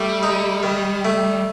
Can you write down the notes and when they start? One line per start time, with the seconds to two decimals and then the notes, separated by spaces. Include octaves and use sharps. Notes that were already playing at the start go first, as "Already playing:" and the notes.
Already playing: G3 A3
0.23 D#4
0.63 D#3
1.05 A3